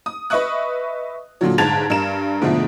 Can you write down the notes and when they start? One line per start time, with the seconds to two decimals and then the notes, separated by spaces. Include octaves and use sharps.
0.06 D#6
0.30 B4 D#5 E5 C#6 D#6 F#6
1.41 A#2 D3 F#3
1.58 G1 G#2 A5 G#6 A6 F7
1.90 G2 A#4 E7
2.42 G#2 B2 D3 F3 A3